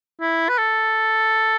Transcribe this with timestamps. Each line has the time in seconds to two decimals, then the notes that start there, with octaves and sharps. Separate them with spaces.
0.21 E4
0.49 B4
0.58 A4